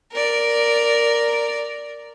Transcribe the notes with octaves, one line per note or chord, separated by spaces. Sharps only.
A#4 D5